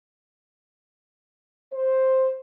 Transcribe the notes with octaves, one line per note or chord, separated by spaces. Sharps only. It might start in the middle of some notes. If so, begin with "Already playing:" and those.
C5